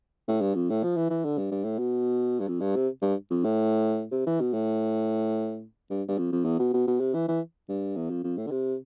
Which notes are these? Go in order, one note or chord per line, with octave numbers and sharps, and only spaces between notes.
A2
G2
F2
A2
F3
E3
E3
D3
G2
G2
A2
B2
G2
F2
G2
C3
G2
F2
A2
C3
E3
B2
A2
G2
G2
F2
F2
E2
B2
B2
B2
C3
E3
E3
G2
E2
F2
F2
A2
D3
C3